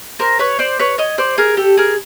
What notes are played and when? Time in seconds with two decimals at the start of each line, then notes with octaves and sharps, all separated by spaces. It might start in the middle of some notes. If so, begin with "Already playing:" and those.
0.19 A#4 C5
0.39 B4 C#5
0.59 C5 D5
0.80 B4 C#5
0.98 C#5 D#5
1.18 C5 D5
1.38 G#4 A#4
1.57 G4 A4
1.77 G#4 A#4